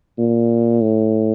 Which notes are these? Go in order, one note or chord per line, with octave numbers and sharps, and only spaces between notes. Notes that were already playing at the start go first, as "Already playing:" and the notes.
A#2
A2